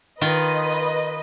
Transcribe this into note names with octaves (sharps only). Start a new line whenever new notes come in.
D#3 F4 B4 D#5